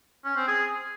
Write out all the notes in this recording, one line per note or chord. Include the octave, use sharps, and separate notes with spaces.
C#4
C4
G#4